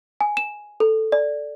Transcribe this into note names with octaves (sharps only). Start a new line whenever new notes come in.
G#5
E7
A4
D5